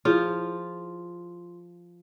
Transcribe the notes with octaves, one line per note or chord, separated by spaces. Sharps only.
F3 E4 F4 G#4 C#5